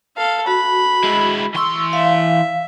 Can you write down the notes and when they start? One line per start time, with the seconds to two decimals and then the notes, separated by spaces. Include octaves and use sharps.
0.17 A4 F5
0.47 F#4 B5
1.04 G#3 E4
1.55 E3 C6 C#6 E6
1.93 E5 F5